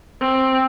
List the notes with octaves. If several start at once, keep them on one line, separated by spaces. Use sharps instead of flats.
C4